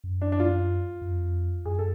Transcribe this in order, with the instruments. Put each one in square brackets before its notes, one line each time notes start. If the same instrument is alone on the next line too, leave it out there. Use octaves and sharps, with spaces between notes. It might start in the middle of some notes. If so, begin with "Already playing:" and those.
[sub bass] F#2
[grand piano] D4
D4
F4
[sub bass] F#2
F2
[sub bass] F#2 [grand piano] G#4
[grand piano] A4